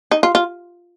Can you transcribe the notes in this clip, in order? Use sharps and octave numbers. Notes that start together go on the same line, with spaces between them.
D#4
F4
F4